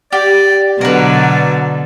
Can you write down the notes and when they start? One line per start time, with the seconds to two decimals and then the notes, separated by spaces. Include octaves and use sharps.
0.12 G4 D5
0.81 B2 D3 F#3 A#4 B4 D5